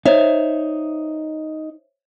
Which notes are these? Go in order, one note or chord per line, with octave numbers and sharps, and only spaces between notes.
D#4 C5 C#5 E5